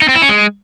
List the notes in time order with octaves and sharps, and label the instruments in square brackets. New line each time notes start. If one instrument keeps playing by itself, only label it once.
[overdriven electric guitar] D#4
C4
E4
C#4
G#3